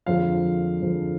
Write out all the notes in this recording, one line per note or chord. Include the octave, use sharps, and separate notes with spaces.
F2 D3 F3 G#3 F4 F5
F2 D3 F3 G#3